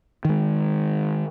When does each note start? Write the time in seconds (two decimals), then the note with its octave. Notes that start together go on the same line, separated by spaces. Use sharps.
0.25 D#3 G#3